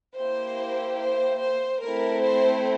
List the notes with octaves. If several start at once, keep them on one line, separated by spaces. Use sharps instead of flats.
A#3 E4 G4 C5
C5
C5
A3 C4 E4 A#4
C5